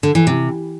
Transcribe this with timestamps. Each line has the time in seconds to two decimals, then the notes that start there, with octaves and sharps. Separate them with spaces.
0.03 D3
0.15 E3
0.27 C3